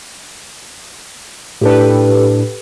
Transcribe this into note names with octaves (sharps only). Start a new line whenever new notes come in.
A2 D4 G4 A4 B4